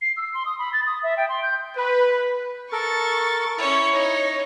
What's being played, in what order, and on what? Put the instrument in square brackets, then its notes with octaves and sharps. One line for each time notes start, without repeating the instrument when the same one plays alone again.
[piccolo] C7
E6
C6
D#6
B5
A6
D#6
E5
G5
C6
G6
[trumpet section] B4
[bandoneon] A4 A#4 [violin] C#6 A6
[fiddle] C#4 C#5 [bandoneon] E4
[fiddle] D#4 [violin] C#5